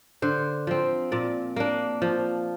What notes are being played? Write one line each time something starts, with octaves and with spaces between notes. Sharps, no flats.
D3 C5
F3 C4
A#2 D5
A#3 D4
F3